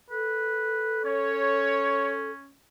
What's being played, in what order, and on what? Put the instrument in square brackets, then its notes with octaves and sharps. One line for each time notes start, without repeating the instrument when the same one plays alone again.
[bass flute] A4 [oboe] B4
[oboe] C#4 [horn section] C#5